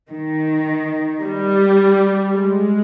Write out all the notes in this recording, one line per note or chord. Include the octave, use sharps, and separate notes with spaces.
D#3
G3
G#3